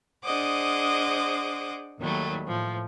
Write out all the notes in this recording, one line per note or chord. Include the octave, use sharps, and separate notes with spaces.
D4 G#4 C5 D#5 F#5 D6
D#2 D#3 F#3 G3 A3
A2 F3